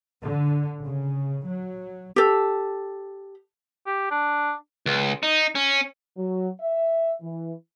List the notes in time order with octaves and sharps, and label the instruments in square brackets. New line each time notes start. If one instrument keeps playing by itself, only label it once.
[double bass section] D3
C#3
F#3
[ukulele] G4 A4
[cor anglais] G4
D4
[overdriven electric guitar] C#2
D#4
C#4
[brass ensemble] F#3
E5
E3